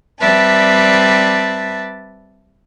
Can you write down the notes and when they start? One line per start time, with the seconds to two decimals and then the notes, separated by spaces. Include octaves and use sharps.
0.20 G3 C4 B4 D5 E5 A5